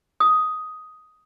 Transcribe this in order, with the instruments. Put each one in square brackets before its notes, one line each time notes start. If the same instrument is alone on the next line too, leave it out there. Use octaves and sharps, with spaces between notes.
[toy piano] D#6